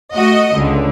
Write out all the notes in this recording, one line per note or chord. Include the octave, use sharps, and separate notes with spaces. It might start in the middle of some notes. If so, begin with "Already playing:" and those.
A3 F#4 D#5
C#2 D3